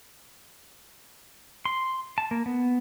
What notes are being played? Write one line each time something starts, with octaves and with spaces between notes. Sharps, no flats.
C6
A5
A#3
B3